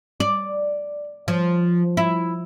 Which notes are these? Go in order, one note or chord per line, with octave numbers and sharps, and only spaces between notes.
D5
F3
E4